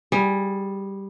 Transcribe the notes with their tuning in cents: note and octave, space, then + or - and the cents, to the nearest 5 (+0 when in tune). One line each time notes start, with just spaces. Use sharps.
G3 +0 G#4 -15